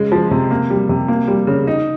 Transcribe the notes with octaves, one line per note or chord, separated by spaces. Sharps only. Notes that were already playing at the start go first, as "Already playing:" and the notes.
Already playing: C#3 G#3
F3
C3
A#3
G3
C3
A#3
G3
C#3
D#4